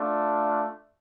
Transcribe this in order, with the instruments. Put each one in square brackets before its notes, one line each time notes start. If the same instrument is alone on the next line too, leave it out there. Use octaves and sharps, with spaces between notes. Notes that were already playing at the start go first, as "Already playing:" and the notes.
Already playing: [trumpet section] A3 D4 F4